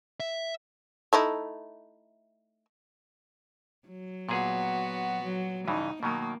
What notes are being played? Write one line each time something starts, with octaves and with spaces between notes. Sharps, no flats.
E5
A3 D#4 E4
F#3
A#2 B3 F#4 G#4
F#3
G2 C#3 E3 D#4
B2 D#3 F#3 A#3